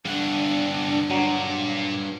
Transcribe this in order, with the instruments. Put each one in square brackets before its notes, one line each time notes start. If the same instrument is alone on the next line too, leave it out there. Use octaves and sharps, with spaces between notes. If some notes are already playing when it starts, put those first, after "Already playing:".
[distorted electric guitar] C2 D3 [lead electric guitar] G2 F#5 [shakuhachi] D4
[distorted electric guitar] A#2 [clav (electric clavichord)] F#3